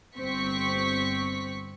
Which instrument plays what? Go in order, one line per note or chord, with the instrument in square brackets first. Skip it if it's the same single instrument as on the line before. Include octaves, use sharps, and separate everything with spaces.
[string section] G1 C4 C#6 B6